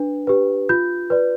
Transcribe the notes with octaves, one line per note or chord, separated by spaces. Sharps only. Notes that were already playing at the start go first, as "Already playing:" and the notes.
Already playing: D4 B4
G4 B4
F4 G6
B4 D5